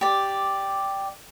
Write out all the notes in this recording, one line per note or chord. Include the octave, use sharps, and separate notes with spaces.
G4 D5